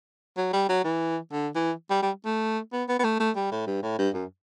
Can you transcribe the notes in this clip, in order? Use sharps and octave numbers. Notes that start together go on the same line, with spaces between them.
F#3
G3
F#3
E3
D3
E3
G3
G3
A3
B3
B3
B3
A3
A3
G3
A2
G2
A2
G2
F#2